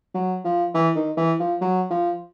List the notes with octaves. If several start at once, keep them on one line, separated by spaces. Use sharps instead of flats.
F#3
F3
E3
D#3
E3
F3
F#3
F3